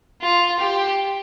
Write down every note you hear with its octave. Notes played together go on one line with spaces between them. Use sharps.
F4
G4